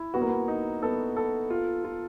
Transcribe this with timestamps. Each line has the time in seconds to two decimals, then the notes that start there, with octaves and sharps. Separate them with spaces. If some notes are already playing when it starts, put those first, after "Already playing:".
Already playing: E4
0.14 B3 F#4
0.22 A#3
0.29 B3
0.48 D#4
0.83 B3 A4
1.17 A4
1.50 F4
1.85 F4